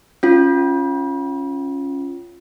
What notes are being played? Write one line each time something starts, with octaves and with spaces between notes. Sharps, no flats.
C#4 F4